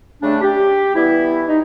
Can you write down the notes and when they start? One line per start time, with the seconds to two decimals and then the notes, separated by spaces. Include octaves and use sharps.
0.22 C#3 G3 A3 D4
0.41 G4
0.95 E3 G3 B3 E4
1.48 D#4